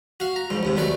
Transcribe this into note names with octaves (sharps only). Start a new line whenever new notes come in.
F#4 F5
A#5
C#2 G#2 F3
D#2 G#2 C3
C#2 D#3 F#3 A3 B4 D5